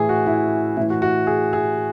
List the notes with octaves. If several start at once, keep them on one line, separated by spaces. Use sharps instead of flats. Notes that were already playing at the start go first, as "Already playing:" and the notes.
Already playing: A2 E3 G#4
F#4
E4
A2 E3 E4
F#4
F#4
G#4
G#4